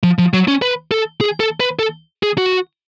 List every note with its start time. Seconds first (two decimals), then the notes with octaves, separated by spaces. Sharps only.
0.03 F3
0.19 F3
0.33 F#3
0.48 C#4
0.62 B4
0.91 A4
1.21 G#4
1.40 A4
1.60 B4
1.79 A4
2.23 G#4
2.38 F#4